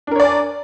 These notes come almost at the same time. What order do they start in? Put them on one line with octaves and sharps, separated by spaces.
D4 A#4 C#5 D5 G#5